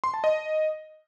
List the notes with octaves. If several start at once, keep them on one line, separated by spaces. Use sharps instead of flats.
C6
A5
D#5